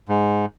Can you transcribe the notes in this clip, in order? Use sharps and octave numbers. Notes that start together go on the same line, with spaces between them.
G#2